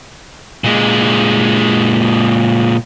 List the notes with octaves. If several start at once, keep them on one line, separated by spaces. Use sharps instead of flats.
A#2 G#3